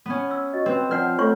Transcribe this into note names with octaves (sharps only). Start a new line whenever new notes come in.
B3 C#4
E6
F#4 D#5
C4 B4
F3 C#5 D5 F#5 F6
A3 F4 C#5 C#6